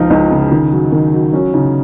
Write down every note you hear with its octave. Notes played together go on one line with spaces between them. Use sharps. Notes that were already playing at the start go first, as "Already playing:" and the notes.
Already playing: C#2 F3 D#4 F4
C#2 D#4
C#3
D#3
F#3
D#3
F#3
F#3 C#4
C#3 D#4